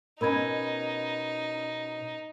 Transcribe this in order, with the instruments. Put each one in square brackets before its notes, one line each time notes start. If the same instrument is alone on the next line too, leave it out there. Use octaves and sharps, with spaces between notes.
[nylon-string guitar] B2 C#4 [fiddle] D#4 [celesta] A#4 B5 G#6